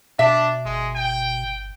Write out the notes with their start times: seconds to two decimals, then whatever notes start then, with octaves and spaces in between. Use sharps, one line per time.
0.19 B2 D4 E5
0.65 G1 G#3
0.95 G5